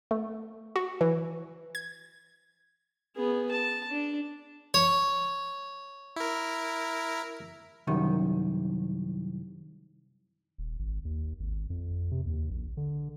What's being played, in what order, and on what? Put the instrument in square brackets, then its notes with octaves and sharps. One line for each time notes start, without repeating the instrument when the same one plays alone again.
[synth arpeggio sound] A3
F#4
E3
G#6
[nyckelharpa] B3 G#4
A5
D4
[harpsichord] C#5
[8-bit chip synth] E4 A#4
[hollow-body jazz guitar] C2 F#2 D#3
[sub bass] D#1
G#1
D#2
G#1
F2
C3
D#2
A#1
D3